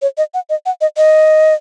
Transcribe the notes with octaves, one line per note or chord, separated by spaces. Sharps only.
C#5
D#5
F#5
D#5
F#5
D#5
D#5